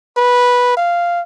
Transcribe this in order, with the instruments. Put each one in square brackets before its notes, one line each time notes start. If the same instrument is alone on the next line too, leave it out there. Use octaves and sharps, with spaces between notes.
[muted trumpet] B4
F5